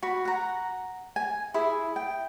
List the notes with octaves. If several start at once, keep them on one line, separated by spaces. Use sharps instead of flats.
F#4 B5
F#5 A#5
G#5
E4 G#4
G5